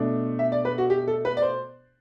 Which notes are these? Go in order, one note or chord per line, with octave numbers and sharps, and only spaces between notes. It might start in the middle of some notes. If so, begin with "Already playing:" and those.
Already playing: B2 A3 D4
E5
D5
B4
F#4
G4
A4
B4
D5
C5